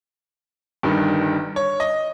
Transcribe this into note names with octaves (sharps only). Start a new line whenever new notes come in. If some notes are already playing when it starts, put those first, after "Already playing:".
G1 G2 D#3
C#5
D#5